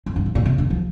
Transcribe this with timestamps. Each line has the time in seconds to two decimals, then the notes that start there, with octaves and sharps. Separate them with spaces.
0.06 F2
0.16 G2
0.26 A2
0.35 A#2
0.45 C3
0.58 D3
0.70 F3